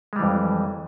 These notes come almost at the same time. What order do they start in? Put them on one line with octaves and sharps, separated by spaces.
G#3 G3 E3 F2